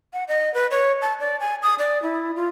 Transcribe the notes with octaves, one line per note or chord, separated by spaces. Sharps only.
F#5
D#5
B4
C#5
A5
D5
G#5
D#6
D5
E4
F4